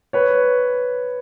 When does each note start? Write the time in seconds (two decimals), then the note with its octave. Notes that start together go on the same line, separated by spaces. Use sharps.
0.13 B4 C#5